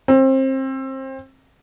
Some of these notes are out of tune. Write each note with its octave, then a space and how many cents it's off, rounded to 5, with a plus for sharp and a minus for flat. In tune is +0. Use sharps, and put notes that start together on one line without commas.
C4 +30